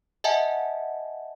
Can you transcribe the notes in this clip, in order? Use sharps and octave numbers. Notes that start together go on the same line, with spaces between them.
D#5 E5 F#5 G#5 A5